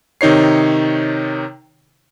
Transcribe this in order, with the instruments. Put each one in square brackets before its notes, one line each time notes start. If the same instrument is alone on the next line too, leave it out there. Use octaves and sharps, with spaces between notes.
[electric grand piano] C3 D#3 D#4 C#5 C7